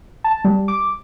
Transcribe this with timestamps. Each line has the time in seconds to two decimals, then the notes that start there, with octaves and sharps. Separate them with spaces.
0.24 A5
0.44 G3
0.68 D6